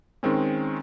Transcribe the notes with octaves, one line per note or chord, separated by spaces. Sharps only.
D#3 G#3 C4 C#4